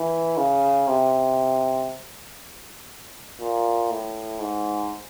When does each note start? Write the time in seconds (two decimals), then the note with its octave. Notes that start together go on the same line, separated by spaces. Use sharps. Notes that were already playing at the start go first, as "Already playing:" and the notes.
Already playing: E3
0.37 C#3
0.88 C3
3.40 A#2
3.91 A2
4.41 G#2